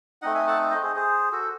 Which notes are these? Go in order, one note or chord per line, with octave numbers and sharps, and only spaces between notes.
A3 C4 D#4 D#5 F#5
E5 G#5
F#5 A5
C5 D#5
G#4 C5
G#4 C5
F#4 A4